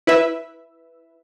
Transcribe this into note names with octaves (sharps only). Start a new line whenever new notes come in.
E4 B4 E5